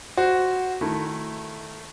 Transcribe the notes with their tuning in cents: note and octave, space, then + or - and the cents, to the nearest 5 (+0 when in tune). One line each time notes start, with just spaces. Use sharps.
F#4 +0 C5 +0
D#3 -10 A3 +0 E4 +0